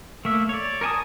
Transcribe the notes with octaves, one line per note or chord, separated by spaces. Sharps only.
A3 A#3 E5
C#5 D5
A#4 C#5 G#5 A5 D#6